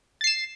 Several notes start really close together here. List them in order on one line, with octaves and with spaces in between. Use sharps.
A6 C7 E7